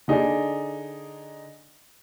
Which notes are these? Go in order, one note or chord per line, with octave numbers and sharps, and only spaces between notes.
D3 D#4 G#4 D5